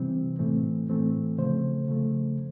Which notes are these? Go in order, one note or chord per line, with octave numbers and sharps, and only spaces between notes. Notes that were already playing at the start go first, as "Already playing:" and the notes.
Already playing: C3 E3 G3 C4
A2 E3 A3 C4
A2 E3 A3 C4
C#3 F3 A3 C5
C#3 F3 A3